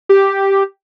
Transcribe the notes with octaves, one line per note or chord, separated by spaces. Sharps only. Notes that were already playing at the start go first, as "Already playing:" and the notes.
G4